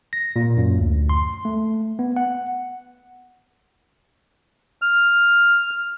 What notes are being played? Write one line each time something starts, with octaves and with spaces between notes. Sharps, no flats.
A#6
A#2
F#2
D2
C6
A3
B3
F#5
F6